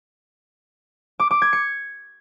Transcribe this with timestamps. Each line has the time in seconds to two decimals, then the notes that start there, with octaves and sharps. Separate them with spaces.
1.20 D6
1.31 D6
1.42 G#6
1.53 C#7